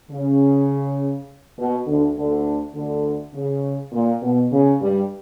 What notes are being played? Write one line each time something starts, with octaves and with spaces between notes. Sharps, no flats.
C#3
B2
D2 D3
D2 D3
D2 D3
C#3
A#2
B2
C#3
G2 G3